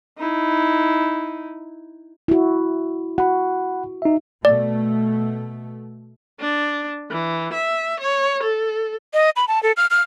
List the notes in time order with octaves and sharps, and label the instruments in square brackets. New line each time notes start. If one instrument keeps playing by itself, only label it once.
[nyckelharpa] D#4 E4
[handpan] E4 F#4
[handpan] F#4 [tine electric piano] F#5 B5
[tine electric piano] D#4 E5
[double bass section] B2 A3 [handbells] D5
[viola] D4
E3
E5
C#5
A4
[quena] D#5
B5
A5
A4
F6
F6